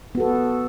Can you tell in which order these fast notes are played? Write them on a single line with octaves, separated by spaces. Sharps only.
B3 F#4 A4